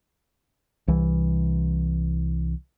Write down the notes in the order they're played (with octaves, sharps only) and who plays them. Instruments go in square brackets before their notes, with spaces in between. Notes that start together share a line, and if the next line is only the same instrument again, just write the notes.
[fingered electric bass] C2 E3